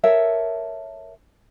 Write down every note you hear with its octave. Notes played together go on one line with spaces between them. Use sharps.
A4 A#4 C#5 E5